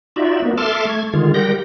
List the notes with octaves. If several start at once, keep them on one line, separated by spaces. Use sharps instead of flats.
D#4 F4 F#4 D5 E5
A#3 B3
A4 E5 A5 C6 D6 F6
A3 G#6
D3 D#3 G#3 F4
G3 G4 A#4 F#5 G6 A#6